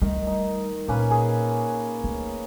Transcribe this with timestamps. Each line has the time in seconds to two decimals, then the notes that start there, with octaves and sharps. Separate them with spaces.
0.02 D#3 G3 A3
0.27 D#4
0.88 A#2 A#3 C#4 B4
1.11 G#4
2.04 A3